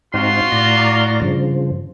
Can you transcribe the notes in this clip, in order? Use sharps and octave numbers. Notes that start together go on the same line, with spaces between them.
G#2 C4 D#4 F4 F#4 C6
A2 D5 A#5
G2 C#3 F3